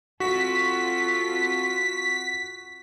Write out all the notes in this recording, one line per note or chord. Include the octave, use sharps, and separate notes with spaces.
C4 F4 F#4 A4 B6